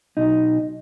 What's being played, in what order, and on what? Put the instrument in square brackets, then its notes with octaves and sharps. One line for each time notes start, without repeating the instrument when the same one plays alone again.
[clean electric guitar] B1 D#4